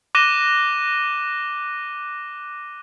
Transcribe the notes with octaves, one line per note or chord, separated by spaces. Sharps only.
D6 F#6 A#6 D#7 E7 G7